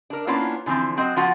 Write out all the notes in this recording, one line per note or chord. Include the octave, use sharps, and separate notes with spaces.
D4 A#4
A#3 B3 C#4 D4 E4 F4
D3 E3 F3 A#3 C4
F#3 C4 F#4 D#5
F3 B3 F4 F#4 F#5